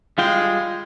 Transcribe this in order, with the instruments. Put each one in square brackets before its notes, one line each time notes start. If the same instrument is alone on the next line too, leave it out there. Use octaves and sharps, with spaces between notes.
[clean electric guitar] G3 F4 G5 [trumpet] G#3 [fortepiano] F5